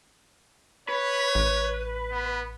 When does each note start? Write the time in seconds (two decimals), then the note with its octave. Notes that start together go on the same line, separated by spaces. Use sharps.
0.89 B4 C#5
1.35 A1
2.11 B3